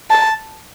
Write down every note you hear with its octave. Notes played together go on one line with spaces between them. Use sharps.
A5